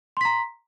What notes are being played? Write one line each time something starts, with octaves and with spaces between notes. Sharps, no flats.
A#5 C6 B6